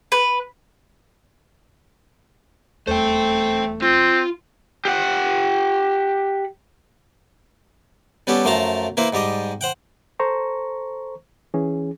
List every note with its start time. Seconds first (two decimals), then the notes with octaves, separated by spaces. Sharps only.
0.12 B4
2.87 D#1 E2 A3 C5 G5
3.82 C4 F4
4.85 G4 F#5
8.27 G3 B3 C#4 G4 A4
8.45 F#2 F3 A3 F4 A5 A#5
8.97 A#3 E4 B4 C5
9.13 G#2 G3 G4 D#5
9.61 C5 F#5 G5
10.20 A4 C5 A#5 C#6
11.54 E3 C#4 G#4